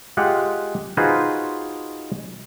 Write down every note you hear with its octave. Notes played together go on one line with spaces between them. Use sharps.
G#3 F4 G4 F#5
D#4 F4 F#4 G#4 B4 C5